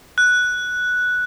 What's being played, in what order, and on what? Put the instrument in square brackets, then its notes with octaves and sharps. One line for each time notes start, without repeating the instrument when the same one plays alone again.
[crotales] F#6